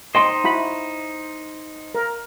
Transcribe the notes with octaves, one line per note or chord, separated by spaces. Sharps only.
D#4 C5 D#5 G5 C6
E4 F#4 B5
A#4